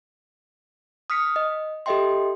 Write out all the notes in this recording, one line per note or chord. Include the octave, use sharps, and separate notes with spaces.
D#6 F6 B6 C#7
D#5
G4 A4 D#5 E5 G5 C6